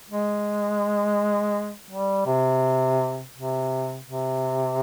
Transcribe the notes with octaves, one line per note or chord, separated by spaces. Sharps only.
G#3
G3
C3
C3
C3